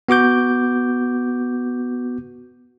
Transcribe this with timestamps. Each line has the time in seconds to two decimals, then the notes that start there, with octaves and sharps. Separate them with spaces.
0.09 B3 F#4 D6 G6